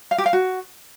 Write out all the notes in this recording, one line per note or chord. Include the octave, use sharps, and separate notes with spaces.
F5
G4
F5
F#4